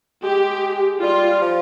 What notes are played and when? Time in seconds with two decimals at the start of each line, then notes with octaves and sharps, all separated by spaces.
0.23 G#3 G4
1.02 G3 F4
1.42 F3